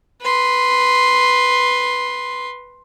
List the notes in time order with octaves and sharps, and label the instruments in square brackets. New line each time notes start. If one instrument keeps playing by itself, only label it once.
[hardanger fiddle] B4 C6